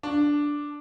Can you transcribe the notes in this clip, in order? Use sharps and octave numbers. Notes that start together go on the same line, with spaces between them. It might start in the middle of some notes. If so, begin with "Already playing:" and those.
D4